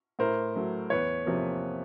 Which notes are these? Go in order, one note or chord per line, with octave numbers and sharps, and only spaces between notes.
A2 A#4 C5
F#3 A3
E2 B4 C#5
C3 F3 A#3